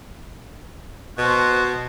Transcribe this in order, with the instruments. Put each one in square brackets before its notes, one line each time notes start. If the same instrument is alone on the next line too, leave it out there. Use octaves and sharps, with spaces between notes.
[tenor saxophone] B2 [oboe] F#4 [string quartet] C5 A5